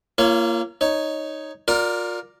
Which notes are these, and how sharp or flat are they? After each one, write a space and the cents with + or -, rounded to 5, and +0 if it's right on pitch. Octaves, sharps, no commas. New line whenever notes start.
A#3 +0 F4 -40 C#5 +0
D#4 +0 C#5 +0
F4 +35 A#4 +0 D5 +0